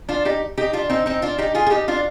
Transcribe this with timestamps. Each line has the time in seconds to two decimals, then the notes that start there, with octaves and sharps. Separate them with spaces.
0.09 D4 F4
0.25 D#4 G4
0.58 D#4 G4
0.73 D4 F4
0.90 C4 D#4
1.06 C4 D#4
1.22 D4 F4
1.38 D#4 G4
1.55 F4 G#4
1.66 G#4
1.71 D#4 G4
1.88 D4 F4